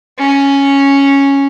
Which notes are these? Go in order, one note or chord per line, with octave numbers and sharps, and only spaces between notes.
C#4